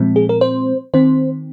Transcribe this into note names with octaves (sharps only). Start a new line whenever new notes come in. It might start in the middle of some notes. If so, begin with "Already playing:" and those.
Already playing: A#2 F3 G#3 C4
G#4
A#4
C5
D#3 C4 C5